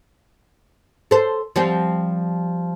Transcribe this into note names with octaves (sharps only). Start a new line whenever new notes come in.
A4 C5
F3 G3 C4